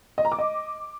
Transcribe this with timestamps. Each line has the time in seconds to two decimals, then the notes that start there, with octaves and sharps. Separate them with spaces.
0.18 D#5
0.25 A#5
0.32 D6
0.38 D#5